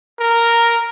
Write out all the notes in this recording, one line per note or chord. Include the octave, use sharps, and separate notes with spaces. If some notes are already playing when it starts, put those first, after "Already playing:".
A#4